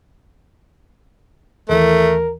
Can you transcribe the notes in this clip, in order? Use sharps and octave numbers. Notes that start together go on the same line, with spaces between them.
D#2 E3 A3 A#4